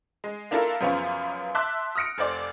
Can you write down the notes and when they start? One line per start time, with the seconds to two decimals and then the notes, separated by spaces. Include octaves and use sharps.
0.24 G#3
0.51 A#3 D4 E4 F4 A4 A#4
0.81 F#2 C#3 F3 B3 C#4 F4
1.55 E5 A5 C6 D6 E6 F#6
1.95 D#6 F6 A#6 C#7 D7
2.18 F1 C5 D5